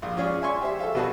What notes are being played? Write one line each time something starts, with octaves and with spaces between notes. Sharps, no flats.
A#1 F5
C#4 F4 G#4 C#5 D5
E5 G#5 C6 C#6
G4 C5 E5
A4 E5 F5
B2 B3 F#4 G#4 B4 A5